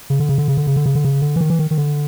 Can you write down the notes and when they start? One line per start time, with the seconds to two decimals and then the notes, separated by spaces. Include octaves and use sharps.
0.10 C#3
0.20 D3
0.29 C#3
0.38 D3
0.48 C#3
0.57 D3
0.67 C#3
0.76 D3
0.86 C#3
0.95 D3
1.05 C#3
1.22 D3
1.36 E3
1.41 D#3
1.50 E3
1.59 D#3
1.71 D#3
1.78 D3